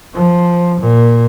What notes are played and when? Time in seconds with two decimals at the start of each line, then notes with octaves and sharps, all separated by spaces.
0.14 F3
0.80 A#2